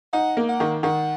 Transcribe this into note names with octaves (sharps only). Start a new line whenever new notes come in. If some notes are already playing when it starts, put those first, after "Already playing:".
D#4 F#5
A#3
F#5
D#3
D#3 F#5